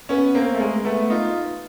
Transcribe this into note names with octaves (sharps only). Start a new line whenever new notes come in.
B3 C#4
A#3 C4
A3
G#3 A#3
A3 B3
D#4 F4